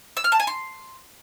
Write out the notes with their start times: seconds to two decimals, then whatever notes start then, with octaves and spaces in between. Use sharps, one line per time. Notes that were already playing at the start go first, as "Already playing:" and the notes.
0.17 E6
0.24 F6
0.32 A5
0.40 G#5
0.47 C6